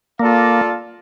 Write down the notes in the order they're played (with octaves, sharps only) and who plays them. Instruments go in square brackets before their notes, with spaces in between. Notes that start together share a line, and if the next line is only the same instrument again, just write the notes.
[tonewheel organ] A#3 [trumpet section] F4 A4 D5 F5